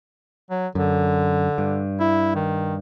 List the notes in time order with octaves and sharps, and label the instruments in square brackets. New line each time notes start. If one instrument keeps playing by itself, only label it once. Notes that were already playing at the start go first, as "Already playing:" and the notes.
[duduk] F#3
[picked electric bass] F#2 [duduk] D3
[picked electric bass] G2
[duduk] E4
D#3